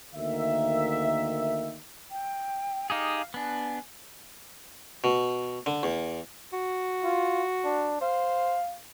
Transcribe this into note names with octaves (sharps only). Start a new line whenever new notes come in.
D2 D#3 A#3 E5
G5
D#4 G4 G#4 F5
B3 D4 G#5
B2
D3
E2
F#4
F4
D4
C5 F5